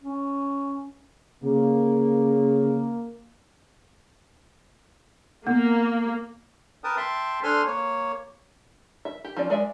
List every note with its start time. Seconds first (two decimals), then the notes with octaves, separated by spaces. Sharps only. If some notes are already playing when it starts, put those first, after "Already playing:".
0.03 C#4
1.43 C#3 A#3
5.47 A#3 B3
6.84 A#4 B4 G5 A5 D#6
6.97 E5 G5 A5 C6
7.43 D4 A4 C5 G#5 C6 F6
7.66 A#3 C#5
9.05 E5
9.25 G4
9.37 F3 C#4 D5
9.50 G#3 D5 E5